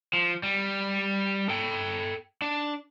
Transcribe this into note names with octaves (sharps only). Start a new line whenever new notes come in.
F3
G3
A4 G5
D4